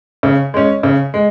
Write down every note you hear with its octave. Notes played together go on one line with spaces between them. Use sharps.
C#3
G#3 C#4
C#3
G#3